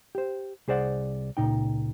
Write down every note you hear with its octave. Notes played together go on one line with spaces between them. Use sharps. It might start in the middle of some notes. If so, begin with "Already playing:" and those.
G4 C5
C2 G#4 C5 D5 F#5
C#2 A#2 D#4 G5